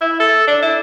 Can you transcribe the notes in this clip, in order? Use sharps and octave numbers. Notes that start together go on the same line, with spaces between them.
E4
A4
D4
E4